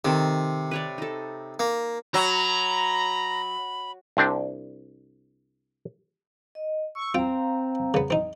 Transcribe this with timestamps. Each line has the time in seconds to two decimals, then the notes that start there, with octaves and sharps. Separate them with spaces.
0.05 C3 D#3 C4 A4
0.71 B4 C#5 D5
0.98 D#4 A4
1.59 A#3
2.14 F#3 A#5 B5
4.17 C2 C4 D4 G5
6.55 D#5
6.95 C#6 E6
7.14 C4 F4 F5 G5 A#5
7.94 C#3 B3
8.10 C4 D#4